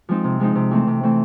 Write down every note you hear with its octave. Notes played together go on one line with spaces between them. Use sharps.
F3 G#3 C4 D#4
C3
F3 G#3 C4 D#4
C3
E3 A3 C4
C3
E3 A3 C4